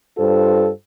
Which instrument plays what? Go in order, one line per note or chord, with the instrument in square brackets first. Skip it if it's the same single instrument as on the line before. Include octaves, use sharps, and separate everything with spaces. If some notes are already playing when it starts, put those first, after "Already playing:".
[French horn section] G2 F4 A4 C5